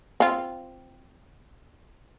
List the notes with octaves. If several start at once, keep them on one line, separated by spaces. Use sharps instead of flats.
C4 F4